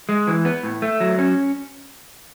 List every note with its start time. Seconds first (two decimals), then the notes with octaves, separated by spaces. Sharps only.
0.09 G#3
0.27 E3
0.45 B3
0.63 A2
0.82 A3
1.00 F#3
1.19 C#4